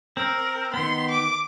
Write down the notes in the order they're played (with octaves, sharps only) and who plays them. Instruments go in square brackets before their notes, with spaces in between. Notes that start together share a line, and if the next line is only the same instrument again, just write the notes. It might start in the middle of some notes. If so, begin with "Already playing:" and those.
[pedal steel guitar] C4 [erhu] A#4
[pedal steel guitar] D#3 B3 [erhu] C6
[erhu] D6